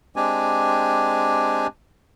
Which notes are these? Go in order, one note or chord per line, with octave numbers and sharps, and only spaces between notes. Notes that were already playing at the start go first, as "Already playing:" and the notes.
G#3 C4 D4 G4 G#5